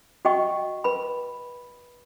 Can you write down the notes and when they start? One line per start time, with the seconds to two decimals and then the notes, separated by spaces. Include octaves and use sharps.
0.25 F#4 D#5 G5 C#6
0.84 B4 B5